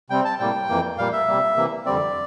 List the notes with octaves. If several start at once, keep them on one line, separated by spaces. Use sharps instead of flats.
C3 G3 C4 G5
A5
A2 G3 A#3 G5
F2 E3 A#3
A#2 G3 A#3 F5
E5
C3 G3 A#3
C3 E3 A#3
F2 D3 G3 C4 D5